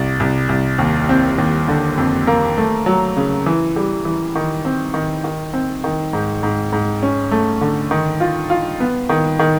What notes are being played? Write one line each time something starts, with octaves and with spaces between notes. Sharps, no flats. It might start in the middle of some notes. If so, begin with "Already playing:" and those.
Already playing: C2
C2
C2
D#2
C4
D#2
D3
F2
A#3
A3
F#3
C#3
E3
G3
E3
D#3
C4
D#3
D#3
C4
D#3
G#2
G#2
G#2
C#4
A3
D3
D#3
F4
F4
B3
D#3
D#3